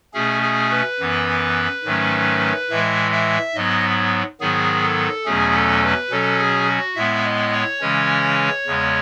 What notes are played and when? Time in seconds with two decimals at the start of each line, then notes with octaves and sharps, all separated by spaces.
0.14 B2 A3 C#4 G#4
0.42 G#4
0.71 B4
1.00 F#2 E3 B3
1.84 G#2 D#3 F#3 A3 C#4
2.70 A2 E3 G#3 E5
3.12 E5
3.55 G#2 F#3 B3 D#5
4.41 G#2 D#3 F#3 B3 G#4
4.83 A4
5.25 E2 B2 F#3 A3 C#4 G#4
5.54 A4
5.83 B4
6.10 B2 F#3 C#4 A4
6.39 G#4
6.68 F#4
6.96 A2 G#3 B3 E5
7.25 D#5
7.52 C#5
7.81 C#3 E3 G#3 C#4
8.67 E2 C#3 G#3 B3